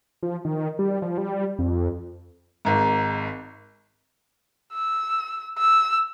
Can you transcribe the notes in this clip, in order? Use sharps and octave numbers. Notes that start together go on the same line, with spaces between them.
F3
D#3
G3
F3
G3
F2
G#1 G#2
E6
E6